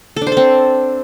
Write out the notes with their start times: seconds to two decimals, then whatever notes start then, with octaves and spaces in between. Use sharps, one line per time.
0.16 A4
0.22 D4
0.27 C5
0.32 A4
0.37 C4